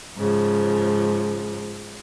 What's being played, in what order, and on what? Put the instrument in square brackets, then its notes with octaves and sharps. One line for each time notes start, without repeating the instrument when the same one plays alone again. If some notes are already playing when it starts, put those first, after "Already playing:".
[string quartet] G#2 C#3 F3